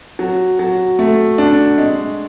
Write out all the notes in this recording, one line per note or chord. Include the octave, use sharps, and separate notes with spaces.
F#3
F#3
A3
D4
G#3